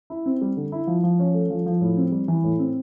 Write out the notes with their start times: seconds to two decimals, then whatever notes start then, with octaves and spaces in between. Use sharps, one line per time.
0.10 E4
0.26 C4
0.41 G3
0.57 D3
0.72 E4
0.87 F3
1.03 F3
1.19 C#4
1.34 A3
1.50 F3
1.66 F3
1.81 A2
1.97 C4
2.12 G3
2.28 E3
2.44 A2
2.59 C4